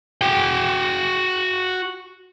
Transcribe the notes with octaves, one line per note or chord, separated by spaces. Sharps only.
F#4 G5